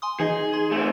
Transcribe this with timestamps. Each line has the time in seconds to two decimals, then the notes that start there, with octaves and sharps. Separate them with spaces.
0.02 G#5 C6 D#6
0.20 E3 D#4 G#4 D#5
0.53 C6
0.71 A3 C4